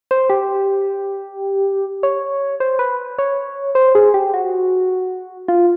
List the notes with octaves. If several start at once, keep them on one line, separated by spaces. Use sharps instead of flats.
C5
G4
C#5
C5
B4
C#5
C5
G#4
G4
F#4
F4